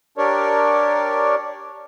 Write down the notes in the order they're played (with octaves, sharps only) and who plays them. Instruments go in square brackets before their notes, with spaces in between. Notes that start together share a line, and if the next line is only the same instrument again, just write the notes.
[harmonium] D4 G4 A#4 C#5 D5